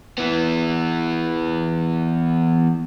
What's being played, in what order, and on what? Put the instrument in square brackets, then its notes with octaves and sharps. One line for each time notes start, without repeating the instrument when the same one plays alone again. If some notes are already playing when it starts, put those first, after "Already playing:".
[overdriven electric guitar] E3 B3